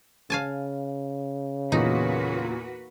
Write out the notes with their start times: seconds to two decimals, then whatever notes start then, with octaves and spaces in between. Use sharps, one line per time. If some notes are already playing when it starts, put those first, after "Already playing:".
0.30 C#3 F5 G#5 A5
1.72 E2 A#2 A#3 D#4 F#4 B4